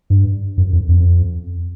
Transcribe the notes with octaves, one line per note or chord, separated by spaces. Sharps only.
G2
F#2
F2
F2